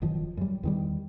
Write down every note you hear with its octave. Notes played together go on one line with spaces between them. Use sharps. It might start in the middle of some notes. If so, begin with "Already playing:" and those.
E1 F#2 D#3 F3
F#2 G3
E2 D#3 G3